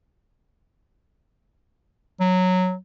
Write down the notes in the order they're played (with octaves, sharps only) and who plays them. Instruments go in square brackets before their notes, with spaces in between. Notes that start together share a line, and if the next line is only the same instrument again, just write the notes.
[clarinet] F#3